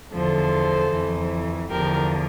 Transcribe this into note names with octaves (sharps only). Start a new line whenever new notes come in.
E2 D3 F3 A4 C5
F2 E3
E2 D3 F3 G4 A#4